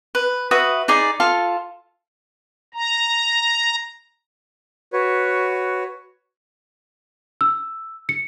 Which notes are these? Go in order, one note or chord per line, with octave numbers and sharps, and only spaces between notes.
B4
F#4 B4 E5 D#6
D#4 G#4 D5
F4 A4 F5
A#5
F#4 B4 C#5
E6
C#7